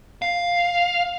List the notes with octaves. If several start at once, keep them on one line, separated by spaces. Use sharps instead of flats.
F5